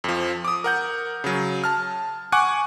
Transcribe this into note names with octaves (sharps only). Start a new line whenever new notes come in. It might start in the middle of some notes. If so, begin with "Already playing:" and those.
F2 F3
D6 D#6
A#4 F#5 G6
C#3 F#3
A5 F6
F#5 G#5 C#6 D6 F#6